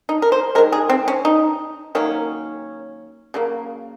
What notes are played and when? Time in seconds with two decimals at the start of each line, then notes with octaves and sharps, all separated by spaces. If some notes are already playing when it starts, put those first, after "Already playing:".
0.09 D#4
0.22 A#4
0.32 C5
0.55 D#3 G#3 A#4
0.73 G#4
0.90 C4
1.08 C#4
1.25 D#4
1.95 D#3 F#3 A#3 C#4
3.34 C#3 F#3 A#3